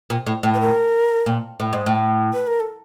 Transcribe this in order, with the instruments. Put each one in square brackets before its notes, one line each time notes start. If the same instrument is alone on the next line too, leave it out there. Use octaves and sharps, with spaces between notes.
[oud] A#2
A2
A2
[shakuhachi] B4
A#4
[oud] A#2
A2
G#2
A2
[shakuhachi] B4
A#4
A4